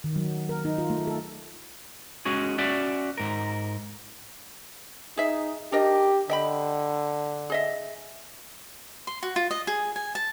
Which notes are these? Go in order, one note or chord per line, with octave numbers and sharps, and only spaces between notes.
D#3
F#3
A#4
D#4
F4
A3
A4
G#3 C#4 F#4 G#4
C#4 F#4 D5 E5
G#2 A#4
D#4 G#4 E5
D4 G4 A#4 D#5
D3 D#5 G5 B5
G#4 D#5 E5
C6
F#4
F4
D#5
G#4
G#5
A5